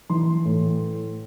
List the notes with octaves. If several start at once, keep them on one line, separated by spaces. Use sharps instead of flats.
E3 C6
A2